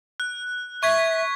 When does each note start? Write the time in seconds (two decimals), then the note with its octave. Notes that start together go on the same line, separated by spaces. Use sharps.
0.20 F#6
0.83 E5 C#6 G#6 B6